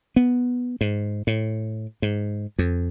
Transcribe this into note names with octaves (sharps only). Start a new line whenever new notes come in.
B3
G#2
A2
G#2
F2